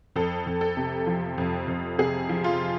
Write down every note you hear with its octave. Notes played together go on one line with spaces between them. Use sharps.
F2 A4
F2
A4
C3
F3
F2
F2
C3 G#4
F3
F4